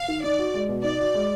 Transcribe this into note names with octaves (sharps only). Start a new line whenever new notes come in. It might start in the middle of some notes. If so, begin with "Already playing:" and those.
Already playing: F5
D#3
D#4 D5
F#4
G#3
B2
D#4 D5
F#4
G#3